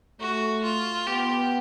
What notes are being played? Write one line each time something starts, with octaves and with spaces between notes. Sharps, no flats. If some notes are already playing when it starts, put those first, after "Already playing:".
A3 F#4
F4
B3 G4